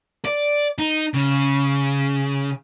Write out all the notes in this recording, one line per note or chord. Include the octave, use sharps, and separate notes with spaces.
D5
D#4
C#3